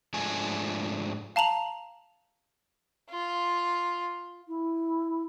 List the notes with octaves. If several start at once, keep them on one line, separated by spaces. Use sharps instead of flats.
G#2 F3 A3 D4 G#5
F5 A5 A#5 F7 F#7
F4
E4